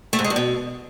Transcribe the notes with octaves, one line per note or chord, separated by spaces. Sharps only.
A3
G#2
G#3
G2
B2